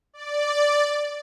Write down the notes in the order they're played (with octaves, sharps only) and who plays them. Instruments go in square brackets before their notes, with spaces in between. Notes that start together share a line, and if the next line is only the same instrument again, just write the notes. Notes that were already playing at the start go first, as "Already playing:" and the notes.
[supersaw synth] D5